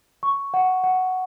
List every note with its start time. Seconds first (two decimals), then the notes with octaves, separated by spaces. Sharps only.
0.23 C#6
0.54 F#5
0.84 F#5